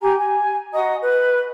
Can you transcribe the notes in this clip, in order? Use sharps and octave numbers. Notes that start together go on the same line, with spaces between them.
G4 G#5 A#5
G#5
F#4 D#5 A#5 D#6
B4